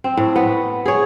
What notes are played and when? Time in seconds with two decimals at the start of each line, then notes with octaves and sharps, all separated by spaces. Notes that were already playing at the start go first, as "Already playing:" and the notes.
0.04 C4
0.17 A2
0.36 B3
0.86 G#4 C#5